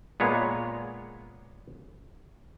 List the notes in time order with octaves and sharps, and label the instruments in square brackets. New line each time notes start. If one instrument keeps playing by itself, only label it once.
[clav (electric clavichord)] A#2 G#3 B3 C#5